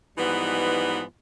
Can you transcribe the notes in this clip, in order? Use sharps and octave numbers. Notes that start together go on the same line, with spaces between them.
G#2 E3 F3 G3 B3 D#4